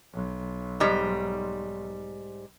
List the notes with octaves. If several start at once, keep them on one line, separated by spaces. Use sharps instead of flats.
B1
G#2 G3